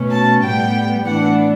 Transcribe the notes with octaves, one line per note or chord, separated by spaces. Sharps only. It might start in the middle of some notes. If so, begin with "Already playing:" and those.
Already playing: B2 A3 C#4
A5
A2 G3 B3 G5
A2 E3 B3 D4 F#5